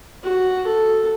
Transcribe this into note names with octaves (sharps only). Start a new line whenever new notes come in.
F#4
A4